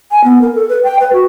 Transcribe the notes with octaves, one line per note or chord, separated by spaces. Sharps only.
G#5
B3
A#4
A4
B4
G5
B4
F#4